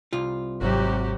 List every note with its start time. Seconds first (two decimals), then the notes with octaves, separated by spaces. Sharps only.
0.13 C2 F4
0.61 G#1 C3 F#3 F#4 G4